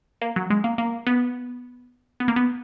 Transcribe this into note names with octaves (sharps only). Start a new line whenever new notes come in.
A#3
F#3
G#3
A#3
A#3
B3
B3
A#3
B3